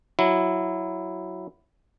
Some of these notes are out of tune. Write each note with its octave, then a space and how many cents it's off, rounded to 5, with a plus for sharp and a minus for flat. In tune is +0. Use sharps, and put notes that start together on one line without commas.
F#3 +0 E4 +0